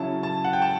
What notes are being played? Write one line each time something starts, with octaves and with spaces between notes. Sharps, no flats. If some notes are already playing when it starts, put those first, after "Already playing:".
Already playing: C#3 F#3 C#4 E4 A5
A5
F#5
G5
A5